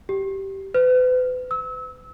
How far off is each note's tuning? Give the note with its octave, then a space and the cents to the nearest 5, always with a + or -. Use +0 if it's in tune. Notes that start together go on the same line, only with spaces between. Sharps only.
G4 -15
B4 +40
E6 -30